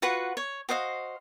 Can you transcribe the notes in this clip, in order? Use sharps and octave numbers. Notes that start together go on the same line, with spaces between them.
F4 F#4 B4 F#5
C#5
F#4 C5 D#5 F5